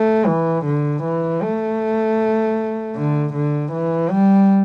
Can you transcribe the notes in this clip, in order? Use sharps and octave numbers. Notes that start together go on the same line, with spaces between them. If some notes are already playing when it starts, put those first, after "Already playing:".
Already playing: A3
E3
D3
E3
A3
D3
D3
E3
G3